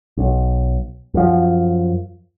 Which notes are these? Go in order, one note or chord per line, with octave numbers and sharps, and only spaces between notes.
B1
F#2 F3